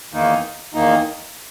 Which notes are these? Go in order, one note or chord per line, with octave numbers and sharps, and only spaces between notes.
E2 D#3 A#3 D#4
E2 D#3 A#3 D#4